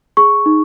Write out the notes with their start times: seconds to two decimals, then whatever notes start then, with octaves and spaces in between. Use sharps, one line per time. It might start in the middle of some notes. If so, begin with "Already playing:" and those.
0.17 G#4 C#6
0.46 D#4